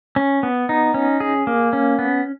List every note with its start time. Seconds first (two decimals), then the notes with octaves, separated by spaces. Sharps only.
0.16 C#4
0.43 B3
0.69 D#4
0.94 C#4
1.20 G#4
1.47 A#3
1.73 C#4
1.99 B3